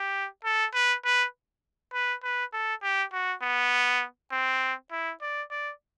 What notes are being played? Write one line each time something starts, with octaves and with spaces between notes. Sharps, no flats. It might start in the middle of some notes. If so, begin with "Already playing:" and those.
Already playing: G4
A4
B4
B4
B4
B4
A4
G4
F#4
B3
C4
E4
D5
D5